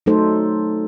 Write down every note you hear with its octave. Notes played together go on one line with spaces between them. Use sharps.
F#3 A3 D#4 A4 C5